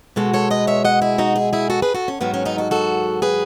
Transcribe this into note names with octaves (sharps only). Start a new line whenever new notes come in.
B2 G#3 F#4 A4
A4 C#5
B4 D#5
C#5 E5
D#5 F#5
E4 G#4
D#4 F#4
E4 G#4
E4 G#4
F#4 A4
G#4 B4
F#4 A4
C#4
G#2 D#3 F#3 B3
C#4
B3 D#4
F#4 A4
F#4 A4
G#4 B4